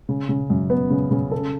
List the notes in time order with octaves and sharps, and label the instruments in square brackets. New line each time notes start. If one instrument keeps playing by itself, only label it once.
[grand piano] C#3
C#3
F#2
B3
C#3
C#3
A4